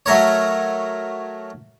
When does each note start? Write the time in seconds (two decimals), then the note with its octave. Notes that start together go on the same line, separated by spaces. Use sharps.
0.06 F#3 A3 A#4 C#5